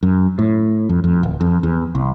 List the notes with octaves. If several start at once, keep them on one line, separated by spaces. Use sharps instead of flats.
F#2
A2
F2
F2
D1
F2
E2
C2